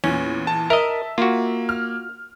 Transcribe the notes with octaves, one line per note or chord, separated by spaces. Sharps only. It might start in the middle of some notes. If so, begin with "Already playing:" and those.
E2 A#2 C#4
A5
A#4 D#5 E5
A#3 F4 F#4
F6